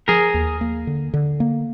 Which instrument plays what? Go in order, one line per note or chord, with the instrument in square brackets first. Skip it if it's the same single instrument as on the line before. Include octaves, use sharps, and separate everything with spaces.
[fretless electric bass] F3 [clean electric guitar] G#4 A#4
[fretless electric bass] D#2
A#3
D3
D3
A#3